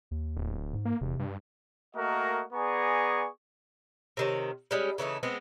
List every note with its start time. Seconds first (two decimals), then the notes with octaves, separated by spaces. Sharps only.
0.11 D#2
0.37 D1
0.73 G#2
0.85 A#3
1.01 E1 C3
1.20 G2
1.96 A3 A#3 F#4 A#4 D#5
2.54 B3 G#4 D5 G#5 A#5 C#6
4.17 C3 D#3 C#5
4.71 G3 G#3 C#4
4.98 C#3 E3 A3 D#4
5.23 G#3 B3 C4